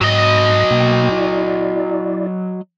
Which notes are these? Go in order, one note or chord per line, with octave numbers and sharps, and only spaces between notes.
G#2 F#3 D#5 A#6
B2 A#3 G5
E4 D5